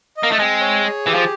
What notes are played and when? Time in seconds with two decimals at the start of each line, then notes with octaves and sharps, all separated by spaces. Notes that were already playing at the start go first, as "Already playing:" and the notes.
0.17 D#5
0.23 A#3
0.32 A3
0.38 G#3 C4
0.61 C#5
0.84 G#4
1.06 E3 G4
1.15 F3